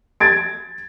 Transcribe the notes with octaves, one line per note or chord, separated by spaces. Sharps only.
G#6 A6 D7